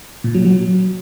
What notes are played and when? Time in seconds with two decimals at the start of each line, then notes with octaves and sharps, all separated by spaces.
0.24 A#2
0.35 F#3
0.45 F#3